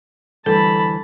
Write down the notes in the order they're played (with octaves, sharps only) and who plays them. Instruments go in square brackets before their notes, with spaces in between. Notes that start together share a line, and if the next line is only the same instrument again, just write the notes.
[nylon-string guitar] D2 E3 G3 [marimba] A4 [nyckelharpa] A5 B5